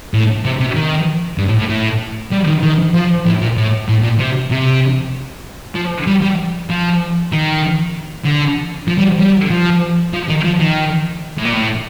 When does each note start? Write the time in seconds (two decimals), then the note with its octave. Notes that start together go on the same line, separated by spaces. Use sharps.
0.14 A2
0.45 C3
0.60 C3
0.76 D#3
1.38 G2
1.48 A2
1.59 A2
1.69 A2
2.31 G3
2.47 D#3
2.63 D#3
2.94 F3
3.26 A2
3.41 A#2
3.57 A2
3.89 A2
4.03 A#2
4.19 C3
4.51 C3
5.75 F3
6.07 G3
6.22 G3
6.70 F3
7.32 D#3
8.25 D3
8.88 F3
8.98 G3
9.20 G3
9.50 F3
10.13 F3
10.29 D#3
10.44 F3
10.59 D#3
11.38 A2
11.45 A#2
11.53 A2